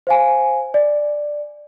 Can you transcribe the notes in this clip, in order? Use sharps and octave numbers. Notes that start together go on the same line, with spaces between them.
C5 F5 G#5
D5